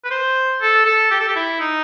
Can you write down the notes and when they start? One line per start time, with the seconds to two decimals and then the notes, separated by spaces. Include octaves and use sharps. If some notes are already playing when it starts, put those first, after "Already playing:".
0.04 B4
0.11 C5
0.61 A4
0.85 A4
1.11 G4
1.19 A4
1.28 G4
1.36 E4
1.60 D#4